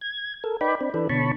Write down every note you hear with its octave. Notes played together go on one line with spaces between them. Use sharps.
G#6
A4 A#4
D#4 B4 D5 G5 B5
C4 D4
E3 D4 A4 B4
B2 D3 C#5 A5 B5 C#6